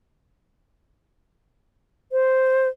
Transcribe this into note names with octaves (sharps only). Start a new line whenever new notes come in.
C5